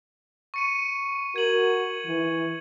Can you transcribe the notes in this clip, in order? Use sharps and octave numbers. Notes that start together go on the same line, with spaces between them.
C#6 C#7 D#7
F#4 A#4 G#6 F#7
E3